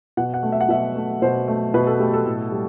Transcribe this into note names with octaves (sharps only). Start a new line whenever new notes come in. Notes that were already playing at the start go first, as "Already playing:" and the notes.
B2 F#5
F#5
A3
E5
F#5
B2 E5
A3
B2 C5
A3
B2 B4
A4
A3 G4
A4
A2
G3